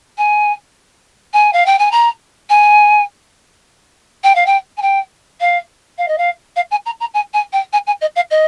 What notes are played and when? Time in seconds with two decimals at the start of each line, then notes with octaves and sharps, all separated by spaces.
0.18 G#5
1.33 G#5
1.53 F5
1.66 G5
1.79 G#5
1.92 A#5
2.50 G#5
4.24 G5
4.35 F5
4.46 G5
4.77 G#5
4.82 G5
5.41 F5
5.98 F5
6.08 D#5
6.18 F5
6.56 F5
6.71 G#5
6.86 A#5
7.00 A#5
7.14 G#5
7.34 G#5
7.53 G5
7.73 G#5
7.87 G#5
8.01 D#5
8.16 F5
8.31 D#5